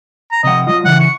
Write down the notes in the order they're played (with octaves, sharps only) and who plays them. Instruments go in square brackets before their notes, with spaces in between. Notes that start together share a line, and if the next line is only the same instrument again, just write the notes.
[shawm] A#5
[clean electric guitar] C3 F3 F#5 [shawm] D#5
[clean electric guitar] F#3 F4 [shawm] D#5
[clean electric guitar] C#3 E3 [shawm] F#5
[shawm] C#6